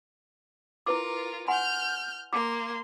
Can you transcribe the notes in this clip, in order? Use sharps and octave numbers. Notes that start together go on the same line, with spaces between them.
E4 F4 A#4 B4 D6
F#5 G#5 C6 F6 G6
A#3 C6 D6